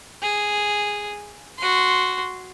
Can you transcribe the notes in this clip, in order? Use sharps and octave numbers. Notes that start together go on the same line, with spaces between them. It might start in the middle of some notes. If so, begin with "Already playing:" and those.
G#4
F#4 C6